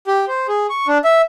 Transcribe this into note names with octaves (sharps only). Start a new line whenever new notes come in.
G4
C5
G#4
C#6
D4
E5